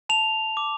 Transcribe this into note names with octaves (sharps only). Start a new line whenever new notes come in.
A5 F7
D6